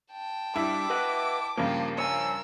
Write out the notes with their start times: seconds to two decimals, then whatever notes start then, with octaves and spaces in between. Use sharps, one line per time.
0.12 G5 A5
0.56 G2 G3 E4 D6
0.90 B4 D#5 F#5
1.57 G2 C#3 F3 A#3 F4 G4
1.98 A#4 C#5 G#5 E6